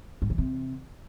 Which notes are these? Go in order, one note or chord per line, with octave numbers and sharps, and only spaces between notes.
G#2
E2
C3